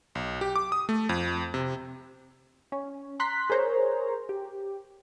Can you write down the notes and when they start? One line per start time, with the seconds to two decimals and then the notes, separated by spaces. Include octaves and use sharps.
0.15 B1
0.41 G4
0.56 D6
0.72 D#6
0.89 A3
1.09 F2
1.54 C3
2.72 C#4
3.20 A#5 C6 F#6 B6
3.50 G#4 A#4 C5 C#5 A#5
4.29 G4